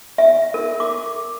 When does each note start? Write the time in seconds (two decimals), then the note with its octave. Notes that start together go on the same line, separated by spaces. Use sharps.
0.18 E5
0.54 A#4
0.80 D6